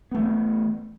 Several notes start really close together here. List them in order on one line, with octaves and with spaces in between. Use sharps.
B3 A3 E3